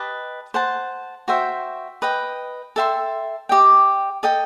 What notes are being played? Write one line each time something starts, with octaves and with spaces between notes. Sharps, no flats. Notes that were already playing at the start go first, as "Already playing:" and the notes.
Already playing: G4 B4 D#5 A5
C5 F#5 A5
F#4 C5 E5 G5
B4 D#5 G5
A4 E5 G5 C6
G4 D#5 G5
A4 D#5 G5